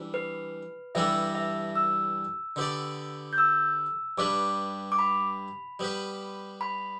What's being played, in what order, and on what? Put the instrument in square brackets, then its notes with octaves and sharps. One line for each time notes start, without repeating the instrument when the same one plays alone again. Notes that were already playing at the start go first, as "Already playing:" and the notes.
Already playing: [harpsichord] E3 G3 D4
[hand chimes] B4
[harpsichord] G2 E3 G3 D4 A4 [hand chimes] E5
[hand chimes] E5
E6
[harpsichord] D3 B3 G4 D5
[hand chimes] G6
E6
[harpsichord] G2 G3 D4 B4 [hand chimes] D6
[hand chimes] D6
B5
[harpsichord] G3 B3 G4 B4
[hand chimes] B5